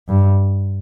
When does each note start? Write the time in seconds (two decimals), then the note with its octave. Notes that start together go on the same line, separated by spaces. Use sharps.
0.08 G2